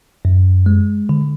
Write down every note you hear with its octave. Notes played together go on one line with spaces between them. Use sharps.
F#2
G#3
D3